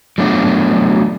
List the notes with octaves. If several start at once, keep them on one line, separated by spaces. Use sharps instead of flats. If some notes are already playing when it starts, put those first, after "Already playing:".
F#3 A3 B3 D4 F4 F#4